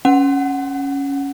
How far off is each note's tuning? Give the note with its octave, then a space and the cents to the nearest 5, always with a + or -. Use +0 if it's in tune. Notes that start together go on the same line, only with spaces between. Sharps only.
C#4 +0 F#5 +0